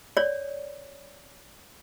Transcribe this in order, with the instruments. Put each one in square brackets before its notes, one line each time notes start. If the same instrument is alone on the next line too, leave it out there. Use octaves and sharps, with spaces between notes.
[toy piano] C#5 D5